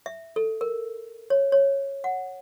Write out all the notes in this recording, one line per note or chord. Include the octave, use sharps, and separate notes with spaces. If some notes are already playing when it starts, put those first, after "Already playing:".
E5
A4
A#4
C#5
C#5
F#5